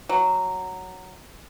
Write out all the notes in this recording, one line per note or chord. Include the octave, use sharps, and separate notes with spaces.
F#3